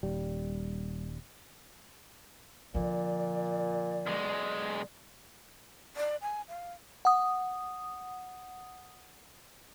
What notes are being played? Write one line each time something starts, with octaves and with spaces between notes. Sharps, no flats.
D#1 G3
A#2 D3 F3 D5
B1 G#3
D5
G#5
F5
F#5 D#6